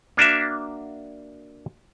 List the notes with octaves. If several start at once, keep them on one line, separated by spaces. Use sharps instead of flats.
A#3 D4 F#4 E5